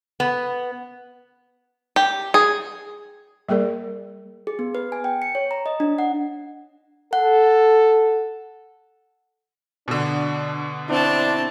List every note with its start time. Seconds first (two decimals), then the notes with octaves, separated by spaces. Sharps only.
0.20 B3
1.96 G4
2.34 G#4
3.49 G3 A#3 G#4 A#4 D5
4.47 G#4
4.59 B3
4.75 B4
4.92 G#5
5.04 G5
5.22 C#7
5.35 C#5
5.51 A#5
5.66 D#5
5.80 D4
5.98 F#5
7.13 A4 F#5
9.88 B2 D3 D4
10.90 C4 D4 E4 A5